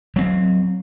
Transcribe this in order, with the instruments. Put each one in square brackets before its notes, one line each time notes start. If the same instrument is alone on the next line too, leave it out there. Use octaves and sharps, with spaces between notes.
[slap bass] F#3 C4